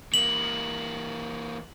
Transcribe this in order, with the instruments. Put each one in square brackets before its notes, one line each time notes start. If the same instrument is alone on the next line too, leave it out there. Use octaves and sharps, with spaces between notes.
[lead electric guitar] E3 A#3 [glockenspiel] F#7